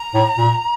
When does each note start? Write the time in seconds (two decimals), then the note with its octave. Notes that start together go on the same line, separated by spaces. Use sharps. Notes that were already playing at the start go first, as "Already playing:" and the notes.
Already playing: A#5
0.14 A2
0.38 A#2